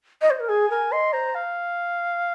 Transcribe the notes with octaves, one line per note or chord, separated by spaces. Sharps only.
D#5
C5
A#4
G#4 G#5
A#4 G#5
D#5 C6
C5 A#5
F5